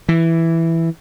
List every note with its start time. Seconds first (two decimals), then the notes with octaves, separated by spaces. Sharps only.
0.09 E3